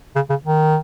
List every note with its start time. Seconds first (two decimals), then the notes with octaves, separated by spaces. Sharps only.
0.16 C#3
0.30 C#3
0.45 D#3